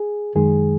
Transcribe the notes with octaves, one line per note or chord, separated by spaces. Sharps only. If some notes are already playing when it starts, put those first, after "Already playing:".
Already playing: G#4
F#2 D#3 G#3 G#4